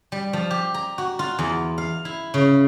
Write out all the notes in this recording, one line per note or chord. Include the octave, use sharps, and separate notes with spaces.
G3
F3
G4
A#5
F#4
F4
E2
F5
E4
C#3